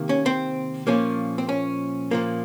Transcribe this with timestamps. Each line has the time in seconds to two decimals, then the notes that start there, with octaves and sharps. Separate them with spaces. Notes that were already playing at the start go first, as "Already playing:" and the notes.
Already playing: C3 D#3 A#3
0.09 C#4
0.26 C4
0.87 A#2 F3 A#3 C#4
1.38 C4
1.49 C#4
2.11 A#2 F3 A#3